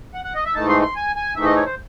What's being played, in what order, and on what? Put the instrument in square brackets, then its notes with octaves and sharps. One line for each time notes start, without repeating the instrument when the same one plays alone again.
[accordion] F#5
F#5
D#5
E5
G#2 E3 A3 D#4 A5
C6
C6
G#5
G#5
G#2 E3 A3 D#4 E5
D#5
C#5
C5